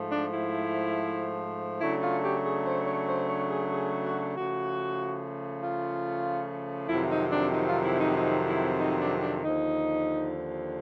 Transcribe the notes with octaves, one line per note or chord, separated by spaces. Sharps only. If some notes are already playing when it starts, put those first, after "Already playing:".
Already playing: G#2 F3 A3
D4
E4
C#3 F#3 A3 D4 E4
F4
G4
G#4
C5
C#5
C5
C#5
G#4
G#4
F#4
C#3 F3 A3 F#4
F4
F2 C3 D#3 F#3 E4
D#4
D4
D#4
F4
E4
D#4
D#4
E4
D#4
D4
D4
D#2 D3 F3 D#4